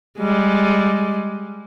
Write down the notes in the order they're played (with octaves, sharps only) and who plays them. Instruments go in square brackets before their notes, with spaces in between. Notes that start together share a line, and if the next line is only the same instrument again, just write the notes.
[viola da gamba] G3 G#3